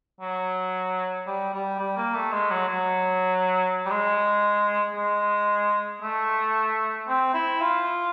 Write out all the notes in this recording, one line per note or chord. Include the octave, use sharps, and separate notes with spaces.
F#3
G3
G3
G3
A#3
A3
G#3
F#3
F#3
G3
G#3
G#3
A3
C4
E4
F4